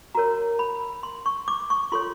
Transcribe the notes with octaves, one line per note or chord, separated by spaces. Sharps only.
F#4 A#4 C#5 A#5
B5
C6
C#6
D6
C#6
F4 A4 C#5 C6